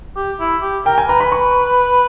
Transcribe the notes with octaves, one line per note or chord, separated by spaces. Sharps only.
G4
E4
G4
A#4 G5
G#5
B4 A#5
B5
C#6